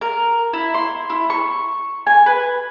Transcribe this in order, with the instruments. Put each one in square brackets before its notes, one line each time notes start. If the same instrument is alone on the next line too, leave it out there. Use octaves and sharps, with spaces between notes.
[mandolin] A#4
E4
C6
E4
C#6
G#5
B4